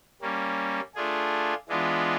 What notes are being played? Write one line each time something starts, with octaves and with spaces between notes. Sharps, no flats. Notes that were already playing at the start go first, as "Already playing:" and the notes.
G3 A#3 C#4
A3 D4 F4 G#4
E3 G#3 B3 D4 F4